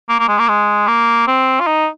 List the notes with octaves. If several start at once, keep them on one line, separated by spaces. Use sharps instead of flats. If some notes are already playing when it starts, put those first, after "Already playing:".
A#3
A#3
G#3
A#3
G#3
A#3
C4
F4
D#4